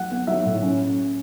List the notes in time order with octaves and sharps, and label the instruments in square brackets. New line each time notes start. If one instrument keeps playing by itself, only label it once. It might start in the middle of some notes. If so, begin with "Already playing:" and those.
Already playing: [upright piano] F#3 F#5
B3
F#3 E5
A2
C#4